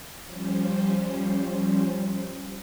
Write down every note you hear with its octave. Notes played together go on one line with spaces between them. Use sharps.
F3 G3 C#4 C5